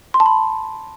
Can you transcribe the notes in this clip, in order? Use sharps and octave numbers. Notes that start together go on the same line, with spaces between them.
C6
A5
B5